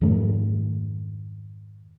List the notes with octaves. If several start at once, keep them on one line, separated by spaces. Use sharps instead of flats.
F2 G#2 D#3 A3